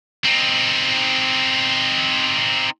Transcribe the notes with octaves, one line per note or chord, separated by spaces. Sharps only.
C4 D#4